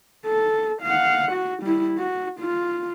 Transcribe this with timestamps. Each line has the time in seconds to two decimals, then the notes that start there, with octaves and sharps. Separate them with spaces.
0.25 A4
0.82 F5 F#5
1.32 F#4
1.63 G3 E4
1.99 F#4
2.40 F4